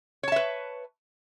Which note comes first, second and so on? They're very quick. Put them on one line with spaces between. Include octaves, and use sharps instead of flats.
C#5 A5 E5 B4